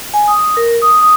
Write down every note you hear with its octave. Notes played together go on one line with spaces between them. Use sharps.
G#5
D#6
A#4
D#6
D#6